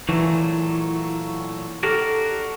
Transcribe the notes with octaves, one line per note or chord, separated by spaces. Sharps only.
A#2 E3 F#3 A3
D4 F#4 G4 A4 A#4 F6